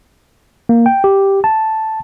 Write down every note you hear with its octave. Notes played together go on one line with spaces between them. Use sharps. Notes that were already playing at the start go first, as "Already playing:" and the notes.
A#3
G5
G4
A5